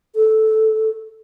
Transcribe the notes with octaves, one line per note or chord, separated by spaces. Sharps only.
A4